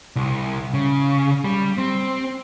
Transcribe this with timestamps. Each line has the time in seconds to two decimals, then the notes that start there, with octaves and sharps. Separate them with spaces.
0.16 C2
0.74 C#3
1.45 G3
1.78 C4